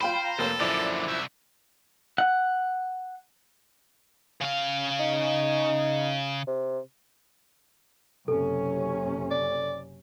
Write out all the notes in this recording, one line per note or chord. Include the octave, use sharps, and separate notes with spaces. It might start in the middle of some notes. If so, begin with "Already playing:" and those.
F#3 F4 C5 G5 B5
A#5
F1 A#3 A4 C#5
F#2 A#2 D3 F3 E4 D5
C2 E5
F#5
C#3 F5
D#4
C3
F#1 C3 C#4 A4
D5